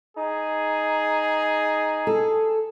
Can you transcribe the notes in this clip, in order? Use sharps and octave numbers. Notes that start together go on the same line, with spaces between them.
D#4 G#4
A4